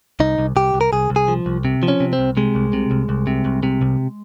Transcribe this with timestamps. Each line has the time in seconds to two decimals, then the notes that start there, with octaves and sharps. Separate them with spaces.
0.20 C2 D#4
0.38 C2
0.56 C2 G4
0.74 C2
0.81 A#4
0.93 C2 G#4
1.10 C2
1.16 G#4
1.28 F3
1.46 C2
1.65 C3
1.83 F3
1.88 C#4
2.00 C3
2.13 C4
2.19 C2
2.37 C3 G#3
2.55 C2
2.73 C3
2.91 C2
3.09 C2
3.27 C3
3.45 C2
3.63 C3
3.82 C2